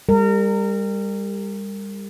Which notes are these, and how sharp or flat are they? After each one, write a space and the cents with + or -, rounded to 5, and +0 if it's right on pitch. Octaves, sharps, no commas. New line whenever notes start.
G3 +30 A#4 -30